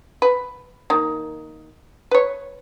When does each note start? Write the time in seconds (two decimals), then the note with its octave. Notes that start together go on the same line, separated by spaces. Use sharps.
0.22 B4
0.90 D#3 A#3
2.11 B4 C#5